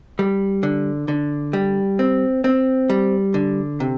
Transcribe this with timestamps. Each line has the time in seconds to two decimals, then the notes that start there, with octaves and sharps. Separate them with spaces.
0.19 G3
0.63 D3
1.08 D3
1.53 G3
1.99 C4
2.44 C4
2.89 G3
3.34 D3
3.80 C3